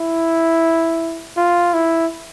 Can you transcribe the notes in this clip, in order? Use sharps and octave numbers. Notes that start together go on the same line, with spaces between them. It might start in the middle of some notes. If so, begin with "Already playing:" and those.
Already playing: E4
F4
E4